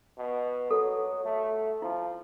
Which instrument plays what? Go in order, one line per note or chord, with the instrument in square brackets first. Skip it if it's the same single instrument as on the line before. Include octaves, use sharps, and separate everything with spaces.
[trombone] B2
[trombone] F#3 [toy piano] A4
[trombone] A3
[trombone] F3 [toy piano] E4